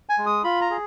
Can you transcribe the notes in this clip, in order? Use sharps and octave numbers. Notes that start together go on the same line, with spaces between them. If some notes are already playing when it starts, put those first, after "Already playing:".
G#5
G#3
D#6
F4 B5
A#5
G#4